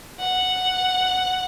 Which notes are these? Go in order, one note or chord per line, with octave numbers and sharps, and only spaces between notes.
F#5